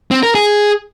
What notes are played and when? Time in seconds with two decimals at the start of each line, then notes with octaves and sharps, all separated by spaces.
0.11 C4
0.23 A#4
0.35 G#4